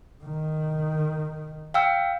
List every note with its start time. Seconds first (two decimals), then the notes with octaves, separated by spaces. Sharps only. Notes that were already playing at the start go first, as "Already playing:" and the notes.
0.24 D#3
1.74 F5 G5 E6